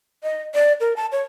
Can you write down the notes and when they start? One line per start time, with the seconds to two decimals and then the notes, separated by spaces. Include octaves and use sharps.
0.23 D#5
0.55 D5
0.80 A#4
0.96 A5
1.12 C#5